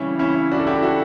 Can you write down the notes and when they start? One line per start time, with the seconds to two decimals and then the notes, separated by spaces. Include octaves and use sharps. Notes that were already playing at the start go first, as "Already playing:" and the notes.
Already playing: C#3 E3 G3 C#4 E4
0.19 C#4 E4
0.51 D4 F#4
0.60 A4
0.67 E4 G4
0.82 F#4 A4